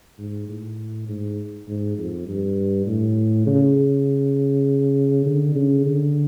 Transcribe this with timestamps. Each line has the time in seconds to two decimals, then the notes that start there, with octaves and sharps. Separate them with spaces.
0.19 G#2
0.49 A2
1.08 G#2
1.68 G#2
1.98 F2
2.27 G2
2.87 A2
3.46 C#3
5.26 D3
5.55 C#3
5.85 D3